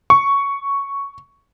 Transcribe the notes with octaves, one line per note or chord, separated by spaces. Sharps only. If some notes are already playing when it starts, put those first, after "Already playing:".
C#6